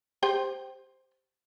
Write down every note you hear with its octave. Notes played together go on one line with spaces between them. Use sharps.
G4 C5 G5